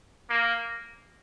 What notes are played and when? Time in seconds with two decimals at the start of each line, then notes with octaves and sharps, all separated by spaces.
0.29 A#3